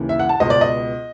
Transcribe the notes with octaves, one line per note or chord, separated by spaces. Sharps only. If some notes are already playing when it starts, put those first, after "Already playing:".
Already playing: D#2 C#3 E3
E5
F#5
A5
C#2 B2 D#5
D5
D#5